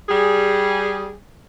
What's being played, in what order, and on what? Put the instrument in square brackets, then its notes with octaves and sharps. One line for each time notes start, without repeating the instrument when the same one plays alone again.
[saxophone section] G3 G#4